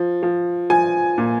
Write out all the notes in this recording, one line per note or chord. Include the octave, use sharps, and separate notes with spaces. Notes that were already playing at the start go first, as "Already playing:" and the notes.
Already playing: F3
F3
F3 G#5
A#2